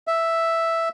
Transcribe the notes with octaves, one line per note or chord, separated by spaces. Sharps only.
E5